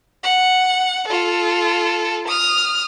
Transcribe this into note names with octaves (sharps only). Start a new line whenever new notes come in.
F#5
F4 A4
D#6 F6